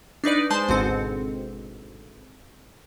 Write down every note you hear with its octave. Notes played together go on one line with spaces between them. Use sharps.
D4 D#4 B4 D5
G#3 C5 A5 C6 G6
G#1 D2 G#2 B2 C4 C#7